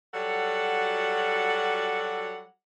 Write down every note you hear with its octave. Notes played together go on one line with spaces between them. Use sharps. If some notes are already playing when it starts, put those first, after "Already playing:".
F#3 G3 F#4 A4 F#5